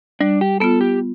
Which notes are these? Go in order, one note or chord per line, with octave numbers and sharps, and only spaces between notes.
G3 D4
G4
B3 F4 A4
G4